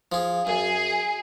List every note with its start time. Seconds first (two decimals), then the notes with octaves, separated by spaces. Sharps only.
0.12 F3 G#4
0.47 F#2 G#4